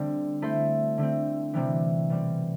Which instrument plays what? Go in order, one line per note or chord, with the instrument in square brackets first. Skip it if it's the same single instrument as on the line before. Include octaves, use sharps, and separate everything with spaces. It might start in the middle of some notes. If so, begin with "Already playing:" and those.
Already playing: [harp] D3 G3 C4
A3 E4 A4 C5
D3 A3 C4
C3 E3 G3 C4 E4
B2 G3 C4